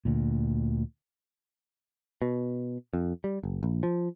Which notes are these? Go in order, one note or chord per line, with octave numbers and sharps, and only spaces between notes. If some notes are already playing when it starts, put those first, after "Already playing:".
D2 A#2
B2
F2
G3
F#1
A#1
F3